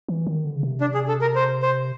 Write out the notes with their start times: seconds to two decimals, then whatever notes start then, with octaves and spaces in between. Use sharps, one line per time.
0.08 E3
0.27 D#3
0.45 D3
0.56 C#3
0.63 C3
0.81 D4
0.94 G#4
1.08 A4
1.21 A#4
1.35 C5
1.62 C5